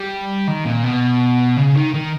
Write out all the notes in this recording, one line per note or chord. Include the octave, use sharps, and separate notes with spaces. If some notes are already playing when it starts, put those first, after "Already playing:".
Already playing: G3
D#3
A#2
B2
C#3
D#3
D#3